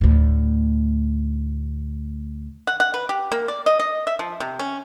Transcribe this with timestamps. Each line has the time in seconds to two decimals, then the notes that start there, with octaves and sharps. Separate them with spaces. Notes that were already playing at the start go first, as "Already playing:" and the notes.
0.01 D2 A2
2.67 F#5
2.80 F#5
2.94 B4
3.09 G4
3.32 A#3
3.48 D5
3.66 D#5
3.80 D#5
4.07 E5
4.19 F3
4.40 C3
4.59 C#4